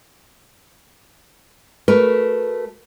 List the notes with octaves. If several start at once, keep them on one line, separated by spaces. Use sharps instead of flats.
A3 F#4 A#4 B4